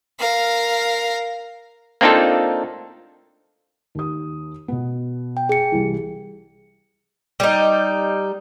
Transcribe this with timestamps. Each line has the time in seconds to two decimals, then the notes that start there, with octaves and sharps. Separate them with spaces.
0.19 A#4 F5
2.01 A#3 C4 D4 D#4 F4 A4
3.95 D#2 D#6
4.68 B2 B3
5.37 G5
5.49 G#4 C#7
5.72 C2 E3
7.40 G3 D#4